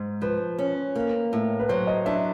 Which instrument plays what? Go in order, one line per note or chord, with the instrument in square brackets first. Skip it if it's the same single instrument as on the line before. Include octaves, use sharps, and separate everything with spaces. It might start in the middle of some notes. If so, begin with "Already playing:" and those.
Already playing: [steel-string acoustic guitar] G#2
[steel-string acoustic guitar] F3 [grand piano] B4
[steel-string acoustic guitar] C#4
A#3
A2
[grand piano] B4
[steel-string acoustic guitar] F#3 [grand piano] C5
[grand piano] D#5
[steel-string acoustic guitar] D4 [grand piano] E5